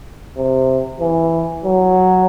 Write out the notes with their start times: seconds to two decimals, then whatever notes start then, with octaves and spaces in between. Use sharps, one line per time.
0.37 C3
1.01 E3
1.64 F#3